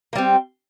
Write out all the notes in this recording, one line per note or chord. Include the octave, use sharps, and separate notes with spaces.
G3 A#3 C4